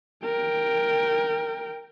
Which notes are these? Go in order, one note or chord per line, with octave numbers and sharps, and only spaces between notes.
A#4 G5